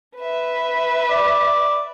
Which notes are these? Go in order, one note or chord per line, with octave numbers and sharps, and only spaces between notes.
B4 E5
D5